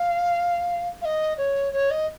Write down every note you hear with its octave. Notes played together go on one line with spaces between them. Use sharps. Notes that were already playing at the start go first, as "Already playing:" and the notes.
Already playing: F5
F5
D#5
C#5
C#5
D#5